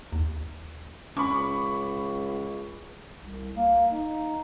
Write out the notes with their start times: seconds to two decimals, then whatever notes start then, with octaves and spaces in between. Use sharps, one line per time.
0.12 D#2
1.17 C#2 C#4 B5 C#6 D6
3.20 C2
3.56 A#3
3.91 D#4